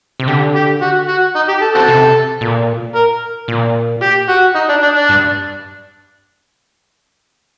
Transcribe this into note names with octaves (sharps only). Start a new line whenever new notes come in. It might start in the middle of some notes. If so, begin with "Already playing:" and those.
C3
D3 G4
G4
F#4
F#4
D#4
G4
A4
C4 F#4 A4
C3
A#2
A#4
A#2
G4
F#4
D#4
D4
D4
D4
G2